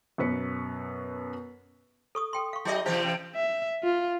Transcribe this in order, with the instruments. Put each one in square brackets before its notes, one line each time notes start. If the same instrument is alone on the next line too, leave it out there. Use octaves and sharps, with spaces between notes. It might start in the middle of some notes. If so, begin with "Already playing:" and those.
[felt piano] F#2 B2 B4 C#7
[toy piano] A4 C#6 D#6
A4 G5 C6
F5 C#6
[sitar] F#3 D#5 [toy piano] E4 G#4 E5
[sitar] C3 E3 G4 [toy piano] E4 C5 F5
[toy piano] C#4
[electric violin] E5
F4